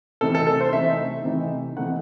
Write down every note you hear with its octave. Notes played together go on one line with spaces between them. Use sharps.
C3 E3 A3 D#4 A4
A4
A4
C5
C3 E3 A3 D#4 E5
C3 E3 A3 D#4
C3 E3 A3 D#4 F#5